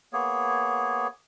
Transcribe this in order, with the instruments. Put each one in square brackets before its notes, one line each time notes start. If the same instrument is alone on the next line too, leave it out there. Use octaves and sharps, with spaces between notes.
[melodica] A#3 B3 G#4 C#5